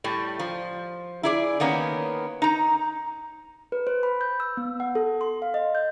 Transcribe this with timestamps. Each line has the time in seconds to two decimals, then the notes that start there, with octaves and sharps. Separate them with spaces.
0.04 A2 G3
0.39 F3
1.23 E4 G#4 D5
1.60 D#3 A#3 B3 C#4
2.42 D#4 A#5
3.72 B4
3.87 C5
4.03 B5
4.21 G6
4.40 E6
4.57 B3
4.80 F#5
4.95 A4
5.21 C6
5.42 F5
5.54 D#5
5.75 G6